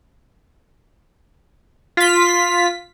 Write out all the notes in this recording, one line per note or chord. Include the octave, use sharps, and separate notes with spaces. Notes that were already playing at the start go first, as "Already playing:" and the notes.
F4 B6